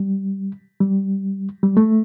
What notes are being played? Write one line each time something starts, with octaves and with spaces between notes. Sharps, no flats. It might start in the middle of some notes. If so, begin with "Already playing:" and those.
Already playing: G3
G3
G3
A3